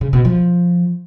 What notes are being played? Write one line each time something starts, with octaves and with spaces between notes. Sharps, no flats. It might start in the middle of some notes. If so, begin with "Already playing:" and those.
C#3
B2
F3